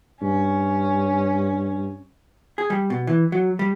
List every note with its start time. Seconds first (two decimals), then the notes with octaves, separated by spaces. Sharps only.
0.22 G2 C#4
2.58 G#4
2.70 G3
2.90 B2
3.07 E3
3.32 F#3
3.59 G3